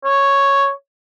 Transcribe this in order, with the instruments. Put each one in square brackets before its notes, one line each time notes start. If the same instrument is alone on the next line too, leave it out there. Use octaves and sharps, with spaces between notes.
[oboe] C#5